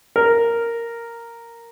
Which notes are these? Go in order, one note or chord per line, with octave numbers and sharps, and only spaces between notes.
A#4